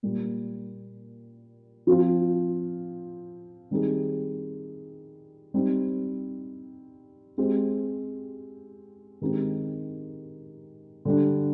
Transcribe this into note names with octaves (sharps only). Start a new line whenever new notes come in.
A#2 G3 A#3
F3 C4 F4
D#3 G3 C4 D#4 G#4
G3 C4 D#4
G#3 C4 G4
D#3 G#3 C4 D#4 G4
D3 G3 D4